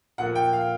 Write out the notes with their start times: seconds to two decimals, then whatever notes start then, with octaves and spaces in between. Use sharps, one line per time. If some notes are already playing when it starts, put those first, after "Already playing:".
0.18 A#2 F3 A#3 F#5
0.35 G5
0.53 F5